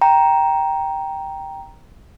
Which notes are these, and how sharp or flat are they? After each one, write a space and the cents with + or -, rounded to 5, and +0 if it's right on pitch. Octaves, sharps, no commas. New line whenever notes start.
G5 +0 A#5 +5